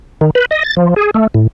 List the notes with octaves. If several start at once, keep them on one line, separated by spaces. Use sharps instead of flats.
D#3
B4
D#5
A6
F3
G#4
A3
A2